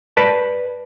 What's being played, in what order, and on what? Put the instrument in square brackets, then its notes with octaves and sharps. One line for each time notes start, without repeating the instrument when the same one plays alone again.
[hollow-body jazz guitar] B4 D5 A5